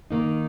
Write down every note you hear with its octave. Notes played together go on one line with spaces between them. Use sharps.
D#3 A#3 D#4